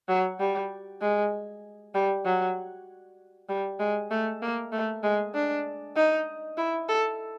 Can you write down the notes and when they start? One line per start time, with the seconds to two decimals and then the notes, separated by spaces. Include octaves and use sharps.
0.09 F#3
0.40 G3
1.02 G#3
1.95 G3
2.25 F#3
3.49 G3
3.80 G#3
4.11 A3
4.42 A#3
4.72 A3
5.03 G#3
5.34 D4
5.96 D#4
6.58 E4
6.89 A4